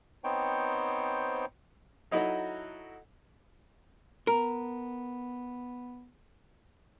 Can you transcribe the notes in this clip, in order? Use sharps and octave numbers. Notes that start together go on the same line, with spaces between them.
B3 C4 D#4 C5 C#5 G5
F#3 D#4 E4 F#4 A4 D#5
B3 A#4